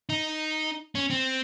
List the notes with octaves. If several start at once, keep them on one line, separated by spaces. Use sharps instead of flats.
D#4
C#4
C4